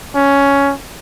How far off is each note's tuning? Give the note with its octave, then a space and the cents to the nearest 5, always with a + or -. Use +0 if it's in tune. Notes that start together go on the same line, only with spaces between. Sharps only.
C#4 +10